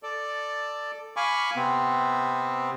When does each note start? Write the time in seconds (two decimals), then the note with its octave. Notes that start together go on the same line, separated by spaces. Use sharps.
0.03 A4 D5
1.16 F5 G#5 B5 C#6 D6
1.56 C3 B3 C4